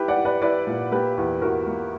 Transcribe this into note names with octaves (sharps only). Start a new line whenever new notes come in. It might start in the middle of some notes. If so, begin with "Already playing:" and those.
Already playing: E4 G4 B4
D5 F#5
E4
B4 D5
E4 B4 D5
A#2
A#3 G4 B4
E2
E2 F#4 A#4
A#3